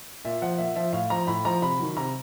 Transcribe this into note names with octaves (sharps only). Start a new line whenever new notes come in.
A#2 E5
F3 F#5
A#2 E5
F3 E5
A2 F5
F3 A#5
A2 B5
F3 A#5
C3 B5
D#3 F#3
C3 A#5